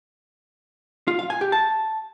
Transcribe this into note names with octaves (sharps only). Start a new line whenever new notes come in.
F4
F5
G#5
G4
A5